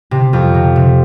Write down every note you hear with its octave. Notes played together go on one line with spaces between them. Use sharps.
C3
F2
C3
C3